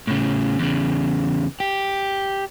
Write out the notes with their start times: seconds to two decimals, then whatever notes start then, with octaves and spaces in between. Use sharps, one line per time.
0.07 A2 C#3
0.59 E2 C#3
1.60 G4